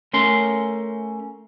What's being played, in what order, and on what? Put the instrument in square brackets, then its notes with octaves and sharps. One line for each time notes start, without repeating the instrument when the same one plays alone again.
[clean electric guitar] A3 C#4 A#4 C6